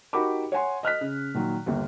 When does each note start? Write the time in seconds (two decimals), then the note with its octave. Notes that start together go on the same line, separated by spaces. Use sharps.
0.13 D#4 F#4 G4 A#4 B5 D6
0.52 C#5 F#5 G#5 C6
0.83 D#5 F6 F#6 B6
1.01 C#3
1.34 A#2 D#3 F#3
1.66 G1 D#2